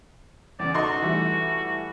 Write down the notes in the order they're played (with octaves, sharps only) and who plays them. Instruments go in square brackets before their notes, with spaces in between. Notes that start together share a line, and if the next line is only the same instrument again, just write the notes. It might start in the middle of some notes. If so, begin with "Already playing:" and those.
[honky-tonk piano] E2 C#3 [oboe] D5
[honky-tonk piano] D#4 A4 C6 [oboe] F#4
[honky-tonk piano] E3 G3 A3